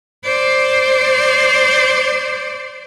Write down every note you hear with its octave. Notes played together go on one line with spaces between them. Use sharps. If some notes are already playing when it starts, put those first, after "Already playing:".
C5 D5